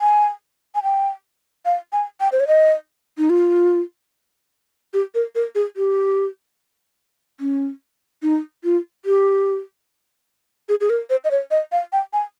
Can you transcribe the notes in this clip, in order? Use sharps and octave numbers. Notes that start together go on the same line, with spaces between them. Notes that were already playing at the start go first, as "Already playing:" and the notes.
G#5
G#5
G5
F5
G#5
G5
C5
C#5
D#5
D#4
F4
G4
A#4
A#4
G#4
G4
C#4
D#4
F4
G4
G#4
G#4
A#4
C5
D#5
C#5
D#5
F5
G5
G#5